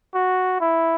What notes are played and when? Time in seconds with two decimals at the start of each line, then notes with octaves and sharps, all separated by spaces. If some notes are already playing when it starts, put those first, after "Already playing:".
0.15 F#4
0.61 E4